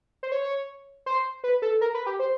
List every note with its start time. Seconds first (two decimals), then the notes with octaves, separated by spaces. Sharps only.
0.23 C5
0.32 C#5
1.06 C5
1.44 B4
1.62 A4
1.81 A#4
1.95 B4
2.06 G4
2.19 C5